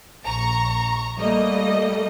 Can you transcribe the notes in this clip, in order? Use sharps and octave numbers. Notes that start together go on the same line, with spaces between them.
A#1 A#5 C#6
G3 A3 A#3 D#5